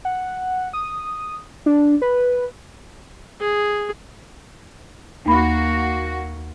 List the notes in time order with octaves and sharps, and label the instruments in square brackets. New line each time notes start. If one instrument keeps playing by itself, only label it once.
[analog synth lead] F#5
D#6
D4
B4
[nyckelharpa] G#4
[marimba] D#2 B5 [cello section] A#3 F#4